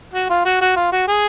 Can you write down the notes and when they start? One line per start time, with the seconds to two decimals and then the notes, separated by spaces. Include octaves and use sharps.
0.14 F#4
0.30 F4
0.45 F#4
0.61 F#4
0.76 F4
0.92 F#4
1.08 G#4